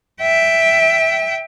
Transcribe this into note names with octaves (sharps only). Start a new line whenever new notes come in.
E5 G5